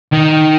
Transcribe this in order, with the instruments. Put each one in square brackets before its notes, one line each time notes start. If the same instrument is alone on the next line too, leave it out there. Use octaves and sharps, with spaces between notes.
[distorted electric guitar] D#3